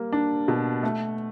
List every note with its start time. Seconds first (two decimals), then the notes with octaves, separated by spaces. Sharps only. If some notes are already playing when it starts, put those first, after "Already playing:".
Already playing: G3 A#3
0.13 D4
0.48 B2
0.83 A3